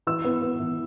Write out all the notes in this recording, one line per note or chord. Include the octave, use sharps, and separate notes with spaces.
E3 E6
B3
B3
E3